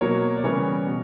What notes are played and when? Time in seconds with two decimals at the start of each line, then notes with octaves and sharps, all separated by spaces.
0.01 B2 F#3 A#3 A#4 C#5
0.37 D5
0.44 C#3 E3 G3 B3 A#4 C#5
0.87 B2